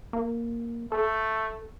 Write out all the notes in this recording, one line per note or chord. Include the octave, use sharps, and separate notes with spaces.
A#3
A3 A4